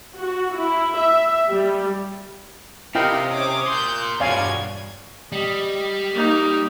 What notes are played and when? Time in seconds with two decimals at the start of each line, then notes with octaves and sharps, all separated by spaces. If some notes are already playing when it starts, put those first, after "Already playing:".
0.17 F#4
0.56 E4
0.97 E5
1.50 G3
2.95 C3 E4 A#4 D#5 F5 G5
3.30 C#4 C#5 D6 D#6
3.68 A#4 C6 G6
4.20 E2 G2 B2 C#5 D5 F5 G#5 G#6
5.32 G3 D#5
6.13 A#3 D#4